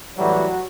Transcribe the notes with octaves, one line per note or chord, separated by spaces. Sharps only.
A2 E3 F#3 G3 F#4